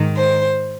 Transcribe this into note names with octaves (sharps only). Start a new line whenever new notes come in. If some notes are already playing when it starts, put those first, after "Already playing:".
Already playing: G#2 D#3
C5